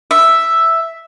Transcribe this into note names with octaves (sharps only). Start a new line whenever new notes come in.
E5